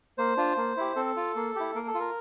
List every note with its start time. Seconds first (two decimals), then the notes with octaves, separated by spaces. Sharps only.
0.18 A#3 C5
0.37 D4 F4
0.58 A#3
0.77 E4 G4
0.96 C4 A4
1.16 F4
1.36 A#3
1.56 E4 G4
1.75 A#3 A#4
1.87 A4
1.94 F4
2.00 A#4